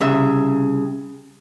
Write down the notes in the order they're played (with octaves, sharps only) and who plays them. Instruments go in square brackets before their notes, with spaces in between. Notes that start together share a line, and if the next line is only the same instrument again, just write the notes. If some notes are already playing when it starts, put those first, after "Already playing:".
[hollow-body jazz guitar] C2 C#3 E5